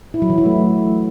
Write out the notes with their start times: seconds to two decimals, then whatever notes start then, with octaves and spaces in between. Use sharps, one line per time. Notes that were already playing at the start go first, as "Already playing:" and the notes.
0.14 E4
0.22 F#3
0.30 E3
0.38 E4
0.46 A3